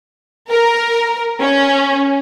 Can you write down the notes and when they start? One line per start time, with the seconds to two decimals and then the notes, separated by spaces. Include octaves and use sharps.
0.50 A#4
1.40 C#4